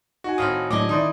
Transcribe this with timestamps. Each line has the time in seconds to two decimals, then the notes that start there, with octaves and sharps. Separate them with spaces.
0.24 D#4 F#4 G#5
0.38 A2 D#3 C4 F5 D#6
0.71 A2 D3 F#3 G#3 D#5 G#5 D6
0.89 D#3 D#4 E4 D5 C6 D#6